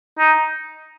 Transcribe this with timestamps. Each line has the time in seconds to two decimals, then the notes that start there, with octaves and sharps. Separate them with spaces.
0.19 D#4